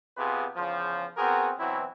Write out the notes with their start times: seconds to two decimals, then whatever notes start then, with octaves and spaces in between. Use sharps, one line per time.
0.17 C3 B3 F4 G#4 B4
0.56 E2 C#3 F3
1.17 B3 C4 F#4 G#4 A#4
1.59 B2 E3 F#3 C4 E4